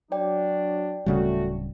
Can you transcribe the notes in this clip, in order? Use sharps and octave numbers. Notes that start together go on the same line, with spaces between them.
F#3 D4 D5 G5
D1 C#3 G3 A3 F#4